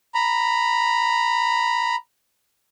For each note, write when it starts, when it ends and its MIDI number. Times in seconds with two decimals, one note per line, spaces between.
0.15 1.95 82
0.15 1.95 83